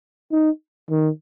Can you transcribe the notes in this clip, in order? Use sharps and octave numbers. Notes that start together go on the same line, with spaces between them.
D#4
D#3